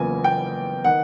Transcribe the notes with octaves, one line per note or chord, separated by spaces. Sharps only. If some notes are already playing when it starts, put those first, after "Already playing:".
Already playing: F#1 E2 C#3 F3 A#3 G#5
G5
D#3 F#5